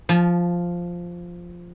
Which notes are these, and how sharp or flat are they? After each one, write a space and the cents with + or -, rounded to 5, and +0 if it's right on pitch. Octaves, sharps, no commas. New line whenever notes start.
F3 +0 A5 -35